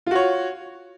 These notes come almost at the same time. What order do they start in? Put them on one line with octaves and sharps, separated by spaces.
F4 F#4 C#5